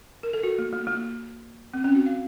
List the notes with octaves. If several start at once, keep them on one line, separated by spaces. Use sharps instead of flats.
A#4
A4
F#4
A#3
A#3
A#3
C4
C#4
F#4
F5